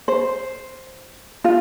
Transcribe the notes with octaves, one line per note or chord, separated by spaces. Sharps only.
C5
F4